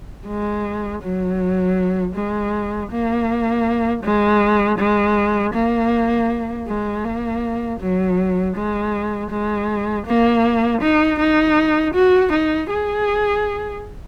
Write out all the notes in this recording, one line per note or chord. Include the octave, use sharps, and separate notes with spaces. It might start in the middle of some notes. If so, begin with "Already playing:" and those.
G#3
F#3
G#3
A#3
G#3
G#3
A#3
G#3
A#3
F#3
G#3
G#3
A#3
D#4
D#4
F#4
D#4
G#4